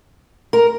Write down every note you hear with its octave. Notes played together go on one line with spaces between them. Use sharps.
A#4